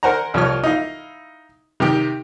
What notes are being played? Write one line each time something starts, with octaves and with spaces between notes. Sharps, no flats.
A#4 C5 F#5 G#5 A#5
C2 F3 C#5 F6
D#4 E4 F5
C3 D#3 G4